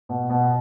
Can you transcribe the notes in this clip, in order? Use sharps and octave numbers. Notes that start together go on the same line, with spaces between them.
B2
B2